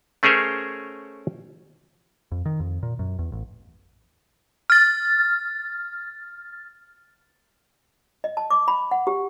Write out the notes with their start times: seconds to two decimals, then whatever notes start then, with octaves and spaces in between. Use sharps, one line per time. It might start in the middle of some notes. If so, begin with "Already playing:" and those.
0.23 A3 C#4 G#4 A#4 C5 C#5
2.32 F2
2.46 D#3
2.60 F2
2.83 A#2
2.99 F#2
3.19 E2
3.32 A1
4.70 F6 A6
8.24 D#5
8.37 A5
8.50 D6
8.68 B5
8.91 F#5
9.07 G4